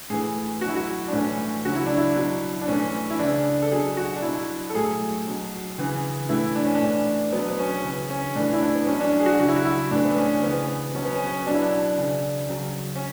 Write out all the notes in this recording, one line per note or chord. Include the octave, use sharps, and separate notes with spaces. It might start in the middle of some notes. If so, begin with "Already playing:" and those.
A2 E3 G#4
B2 F#3 E4 F#4
F#4
D4
A2 E3 C#4
C#3 F#3 F#4
E4
D4
E4
B2 F#3
D4
A2 E3 C#4
E4
C#3 E3 D4
A4
B2 F#3 G#4
F#4
D4
B2 F#3 E4
A4
A2 F#3 G#4
B2 F#3
C#3 E3
A2 E3 E4
D4
C#4
D4
A2 E3
B2 F#3 B3
B3
C#4
C#3 E3
C#4
A2 E3 D4
E4
D4
B3
B2 F#3 C#4
D4
G#4
F#4
C#3 F#3 F#4
E4
F#4
E4
A2 E3 D4
B3
C#4
C#3 E3 B3
B2 F#3 C#4
B3
C#4
B2 F#3 D4 E4
D4
C#3 E3
C#3 F#3
C#4